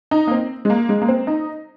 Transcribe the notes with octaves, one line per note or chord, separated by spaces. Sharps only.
D#4
A#3
C4
G#3
A#3
G#3
A#3
C4
D#4